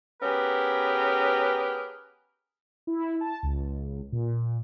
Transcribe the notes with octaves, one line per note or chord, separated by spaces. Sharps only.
B3 C#4 G4 G#4 A#4 B4
E4
A5
C#2
A#2